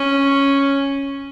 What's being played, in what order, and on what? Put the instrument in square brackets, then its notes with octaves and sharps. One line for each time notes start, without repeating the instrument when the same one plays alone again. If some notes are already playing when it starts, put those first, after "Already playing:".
Already playing: [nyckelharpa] C#4